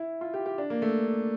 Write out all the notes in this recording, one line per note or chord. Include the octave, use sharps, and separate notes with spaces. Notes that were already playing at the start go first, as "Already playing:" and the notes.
Already playing: E4
F4
G4
G4
D4
A#3
A3